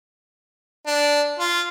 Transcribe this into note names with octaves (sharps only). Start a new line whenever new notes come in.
D4
F4